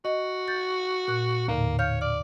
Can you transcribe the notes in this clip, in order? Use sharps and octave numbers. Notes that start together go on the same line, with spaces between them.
F#4 D#5
G6 A6
A#2 F#6
D#2 A2 D3 A#3
C#5 F5 F6 G6
D5 F6